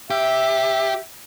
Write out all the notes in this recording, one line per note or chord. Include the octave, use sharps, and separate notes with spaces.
G4 E5